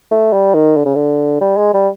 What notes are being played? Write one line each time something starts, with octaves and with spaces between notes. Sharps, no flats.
A3
G3
D#3
D3
C#3
D3
G3
G#3
G3